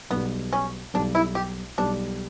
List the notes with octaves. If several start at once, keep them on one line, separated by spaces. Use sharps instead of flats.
B1 B2 G3 B3
C#4
B1 B2 G3 D4
E4
G4
B1 B2 G3 D4